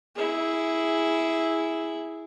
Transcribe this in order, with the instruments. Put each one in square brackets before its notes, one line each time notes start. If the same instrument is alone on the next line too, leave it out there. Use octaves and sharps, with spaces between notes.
[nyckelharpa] E4 G#4